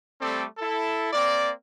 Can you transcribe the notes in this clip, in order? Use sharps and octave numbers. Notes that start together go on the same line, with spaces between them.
G3 A3 C4 A4 D5
E4 A4
A#3 C4 D5